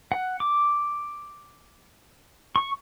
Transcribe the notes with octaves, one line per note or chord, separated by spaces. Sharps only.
F#5
D6
C#6